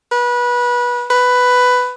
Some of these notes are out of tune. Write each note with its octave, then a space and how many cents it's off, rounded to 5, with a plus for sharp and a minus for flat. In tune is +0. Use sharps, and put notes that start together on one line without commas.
B4 -25
B4 +10